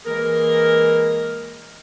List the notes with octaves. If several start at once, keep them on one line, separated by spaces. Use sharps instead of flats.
E3 G#3 A#3 G#4 A#4